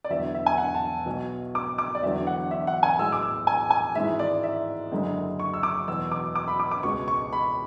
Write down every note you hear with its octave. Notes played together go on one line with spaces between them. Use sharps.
D5
E1 E2 D3 F#3 E5
E5
G#5
F#5
A5
B1 B2 F#3
D6
D6
D5
E1 E2 D3 F#3 E5
F#5
E5
F#5
G#5
B1 A2 G#3 E6
D6
E6
G#5
G#5
G#1 G#2 E3 G#3 E5
D5
E5
F#1 F#2 D3 G#3
C#6
E6
D6
E2 B2 F#3 E6
D6
D6
B5
D6
D6
C#2 B2 G#3 C#6
C#6
B5